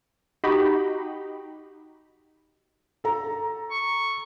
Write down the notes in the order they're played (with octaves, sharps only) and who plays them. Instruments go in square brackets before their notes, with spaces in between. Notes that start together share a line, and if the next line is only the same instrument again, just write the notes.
[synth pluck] D#4 F#4 G4 B5
[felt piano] A4 A#5
[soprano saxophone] C#6